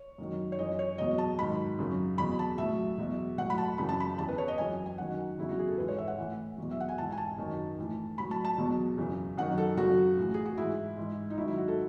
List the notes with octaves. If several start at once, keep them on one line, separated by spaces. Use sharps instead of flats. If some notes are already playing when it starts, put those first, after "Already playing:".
Already playing: C#5
F#2 D#3 F#3
C#5
F#2 E3 D#5
C#5
E2 B2 F#3 D#5
A5
G#2 D#3 F#3 B5
F#2 C#3 F#3
E2 B2 F#3 B5
A5
A2 E5
F#3
E2 B2 F#3
A2 F#3 F#5
B5
A5
F#2 C#3 E3 B5
A5
B5
E2 C#3 E3 A5
B4
C#5
D#5
F#2 E3 G#5
G#5
F#2 D#3 F#3 F#5
E2 C#3 F#3 E4
F#4
G#4
A4
G#2 E3 B4
C#5
E5
F#5
A2 E3
E2 B2 F#3
E5
F#5
G#5
G#2 E3 A5
G#5
A5
F#2 D#3 F#3
A2 E3
A2 F#3 B5
A5
A5
E2 B2 F#3
F#2 C#3 E3
F#2 D#3 F#3 F#5
A4
F#2 C#3 F#3 F#4
A2 E3
G#4
F#4
G#2 E3 E4
G#2 E3
D#4
G#2 D#3 F#3 E4
E4
F#4
A4